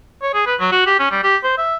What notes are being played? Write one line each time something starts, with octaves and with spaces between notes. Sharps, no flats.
C#5
G#4
B4
F#3
F#4
G4
C#4
G3
G4
C5
E5